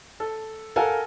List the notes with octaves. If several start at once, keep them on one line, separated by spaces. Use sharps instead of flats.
A4
A4 A#4 F5 F#5 G#5 A#5